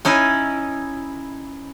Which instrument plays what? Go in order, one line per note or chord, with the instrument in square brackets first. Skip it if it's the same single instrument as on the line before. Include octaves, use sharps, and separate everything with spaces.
[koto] C#4 D#4 E4